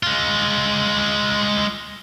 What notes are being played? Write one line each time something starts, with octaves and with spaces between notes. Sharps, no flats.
G#3 F4